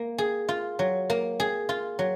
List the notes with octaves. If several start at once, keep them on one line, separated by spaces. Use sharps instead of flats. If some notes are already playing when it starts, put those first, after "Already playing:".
Already playing: A#3
G#4
F4
F#3
A#3
G#4
F4
F#3